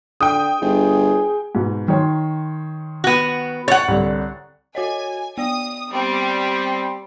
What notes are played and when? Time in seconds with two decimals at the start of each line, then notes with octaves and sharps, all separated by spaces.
0.21 D3 G5 D#6
0.61 G1 G#4
1.55 G#2 B2
1.88 D#3 C#5 C6
3.04 B3 F#4
3.68 C#5 F#5 C#6 A6
3.88 C2 D3
4.75 F#4 C#5 D#5 G#5
5.38 B3 D5 D#6
5.93 G3 C4